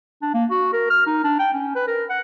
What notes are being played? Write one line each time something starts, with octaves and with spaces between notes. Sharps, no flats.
D4
A#3
F#4
A#4
F6
D#4
D4
G5
C#4
B4
A#4
F#5